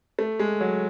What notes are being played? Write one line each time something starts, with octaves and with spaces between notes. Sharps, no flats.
A3
G#3
F#3